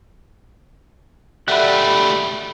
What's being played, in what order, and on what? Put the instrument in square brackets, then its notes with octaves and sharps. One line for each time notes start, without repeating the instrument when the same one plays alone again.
[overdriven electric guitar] G3 A3 [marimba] D5 E5 F#5 [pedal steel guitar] B5 F#6